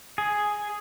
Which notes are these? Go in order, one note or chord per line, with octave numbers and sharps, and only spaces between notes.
G#4